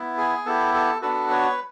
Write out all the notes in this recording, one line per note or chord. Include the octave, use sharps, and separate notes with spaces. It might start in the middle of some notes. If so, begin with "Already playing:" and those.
Already playing: B3 E4
G#4
B3 E4 G4 A4
A4
B3 D4 F#4 A4 B4
B4 C#5